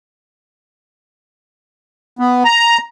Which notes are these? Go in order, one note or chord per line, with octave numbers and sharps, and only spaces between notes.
B3
A#5